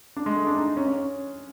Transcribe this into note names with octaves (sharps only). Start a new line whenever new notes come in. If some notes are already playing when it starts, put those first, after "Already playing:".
D4
G#3
A3
D4
D#4
C#4
C#4